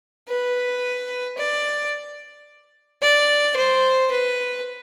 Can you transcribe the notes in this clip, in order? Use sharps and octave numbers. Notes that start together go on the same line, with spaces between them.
B4
D5
D5
C5
B4